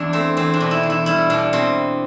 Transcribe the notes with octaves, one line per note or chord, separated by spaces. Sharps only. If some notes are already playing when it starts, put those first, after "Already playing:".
Already playing: E2 D4 E4
A3 C4
E2 C4
D4
B2
E4
E2
E4
G3 E4
B2 D4
B2 C4